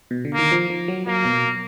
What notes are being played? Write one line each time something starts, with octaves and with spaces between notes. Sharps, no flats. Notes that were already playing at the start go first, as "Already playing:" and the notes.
B2
D3
A#3
D#3
F3
F3
F#3
F#3 A#3
B2